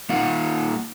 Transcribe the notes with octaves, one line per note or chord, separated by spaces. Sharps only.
A#3 D#4 F4 F5 F#5